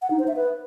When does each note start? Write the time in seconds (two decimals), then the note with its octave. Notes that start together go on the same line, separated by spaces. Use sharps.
0.02 F#5
0.11 D#4
0.19 C5
0.28 E5
0.36 B4